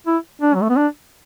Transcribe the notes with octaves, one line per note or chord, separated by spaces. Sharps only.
E4
D4
F#3
A3
B3
D4